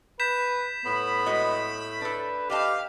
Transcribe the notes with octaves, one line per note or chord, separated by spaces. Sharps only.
B4 G6 B6 E7
A2 B3 B5
G#3 F#4 D#5
D4 A4 B4
G4 B4 D#5 F5 A5